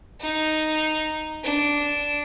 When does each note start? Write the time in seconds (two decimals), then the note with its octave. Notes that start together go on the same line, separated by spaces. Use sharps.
0.21 D#4
1.44 D4